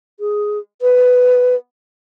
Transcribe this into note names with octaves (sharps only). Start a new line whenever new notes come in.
G#4
B4